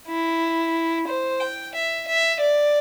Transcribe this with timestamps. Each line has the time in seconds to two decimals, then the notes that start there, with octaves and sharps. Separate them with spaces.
0.08 E4
1.07 C5
1.41 G5
1.75 E5
2.08 E5
2.41 D5